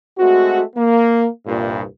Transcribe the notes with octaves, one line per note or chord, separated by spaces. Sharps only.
G#3 A3 C4 F#4
A#3
C2 G2 A#2